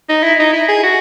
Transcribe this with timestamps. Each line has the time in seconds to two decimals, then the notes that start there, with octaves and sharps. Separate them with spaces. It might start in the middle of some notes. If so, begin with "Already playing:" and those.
0.09 D#4
0.23 E4
0.39 D#4
0.53 E4
0.68 G#4
0.83 F#4